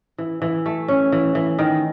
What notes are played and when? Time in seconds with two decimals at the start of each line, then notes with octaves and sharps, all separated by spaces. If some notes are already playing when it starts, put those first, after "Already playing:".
0.18 E3
0.42 E3
0.66 A3
0.88 C#4
1.12 E3
1.35 E3
1.59 D#3